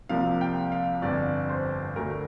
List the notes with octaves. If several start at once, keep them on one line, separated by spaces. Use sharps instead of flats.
C2 C3 F3 A#3 F5
G5
F5
G1 F2 D3 D5
C5
D2 D3 A3 A#4